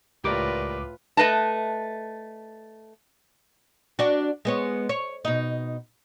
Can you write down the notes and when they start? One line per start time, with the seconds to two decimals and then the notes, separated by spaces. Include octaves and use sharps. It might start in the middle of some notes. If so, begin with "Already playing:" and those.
0.24 C#2 A2 F4 G4 A#4 B4 D5 D6
1.17 A3 B4 D#5 A5
3.99 D4 F#4
4.45 G#3 B3 C#5
4.89 C#5
5.25 B2 D#4